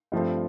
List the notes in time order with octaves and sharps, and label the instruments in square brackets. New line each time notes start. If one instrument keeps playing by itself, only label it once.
[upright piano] G2 F3 A3 C4